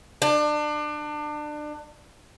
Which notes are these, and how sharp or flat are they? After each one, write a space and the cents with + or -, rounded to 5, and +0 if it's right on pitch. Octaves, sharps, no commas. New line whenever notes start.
D4 +30